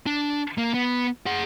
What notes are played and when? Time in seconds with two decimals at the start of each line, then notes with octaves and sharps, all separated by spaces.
0.06 D4
0.58 A#3
0.74 B3
1.26 G#4 F#5